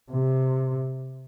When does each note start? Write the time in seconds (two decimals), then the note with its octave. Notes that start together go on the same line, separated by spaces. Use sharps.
0.11 C3